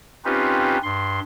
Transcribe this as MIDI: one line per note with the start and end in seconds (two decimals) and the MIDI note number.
0.25 0.78 60
0.25 0.78 61
0.25 0.78 63
0.25 0.78 65
0.25 0.78 67
0.25 0.78 71
0.83 1.20 43
0.83 1.20 84